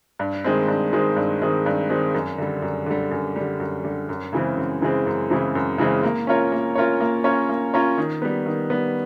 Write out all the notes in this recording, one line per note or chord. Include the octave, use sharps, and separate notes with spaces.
G2
D#3 G#3 C4
G2
D#3 G#3 C4
G2
D#3 G#3 C4
G2
D#3 G#3 C4
F#2
D3 G3
F#2
D3 G3
F#2
D3 G3
F#2
D3 G3
F#2
C#3 E3 G#3 C4
F#2
C#3 E3 G#3 C4
F#2
C#3 E3 G#3 C4
F#2
C#3 E3 G#3 C4
A#3
C#4 F4 A#4 C#5
A#3
C#4 F4 A#4 C#5
A#3
C#4 F4 A#4 C#5
A#3
C#4 F4 A#4 C#5
D#3
G3 B3
D#3
G3 B3